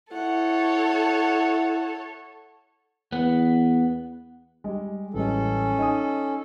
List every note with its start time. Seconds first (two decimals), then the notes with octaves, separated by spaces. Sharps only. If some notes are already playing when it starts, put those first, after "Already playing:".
0.13 E4 A4 C#5 F#5
3.12 E2 B3
4.64 G3 G#3
5.14 A1 G3 G#3 C#4 A4
5.78 D#4 G#5 D#6